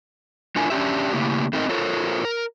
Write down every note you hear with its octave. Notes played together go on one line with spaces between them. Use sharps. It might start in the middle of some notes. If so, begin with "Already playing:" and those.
A3 D4 E4 F4 A#4 G#5
C#4 D4 G4 E5
C#3 A3 A#3 E4 G4
A3 C4 D#4 A#4 D#5
F4 A4 A#4 C5 C#5
A#4